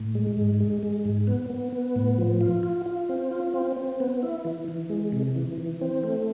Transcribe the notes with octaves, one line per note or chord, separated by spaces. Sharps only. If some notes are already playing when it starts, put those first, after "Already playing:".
Already playing: A2
G#3
G#2
G#3
G#3
G#2
B3
B3
B3
A2
F3
F4
F4
F4
C4
F4
C4
C4
B3
E4
E3
E3
G#3
C3
E3
E3
C4
A3